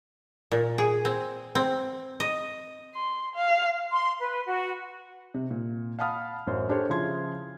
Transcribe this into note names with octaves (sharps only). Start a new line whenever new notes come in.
A#2
G#4
C4
C4
D#5
C6
F5
C6
B4
F#4
C3
A#2
F5 F#5 A5 B5 D#6 F6
A1 F#2 C5
D4 G4 A4 C5 C#5
C#3 F3 E4 C6 G#6